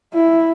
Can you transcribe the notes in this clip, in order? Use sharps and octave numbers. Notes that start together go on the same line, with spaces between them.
E4